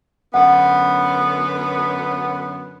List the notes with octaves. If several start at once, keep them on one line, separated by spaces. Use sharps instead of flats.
F#2 D3 B3 F#5